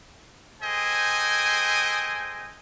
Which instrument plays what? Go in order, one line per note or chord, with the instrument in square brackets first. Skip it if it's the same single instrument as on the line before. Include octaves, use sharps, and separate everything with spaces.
[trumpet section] G#4 A4 C5 D#5 G5 G#5